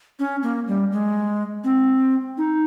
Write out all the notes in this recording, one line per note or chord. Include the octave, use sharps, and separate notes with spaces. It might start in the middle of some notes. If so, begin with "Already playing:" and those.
C#4
A#3
G3
G#3
C4
D#4